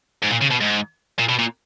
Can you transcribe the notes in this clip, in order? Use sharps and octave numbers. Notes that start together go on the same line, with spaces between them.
G#2
A#2
C#3
B2
G#2
A#2
B2
A#2